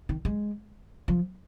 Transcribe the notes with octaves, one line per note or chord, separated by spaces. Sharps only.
D#3
G#3
F3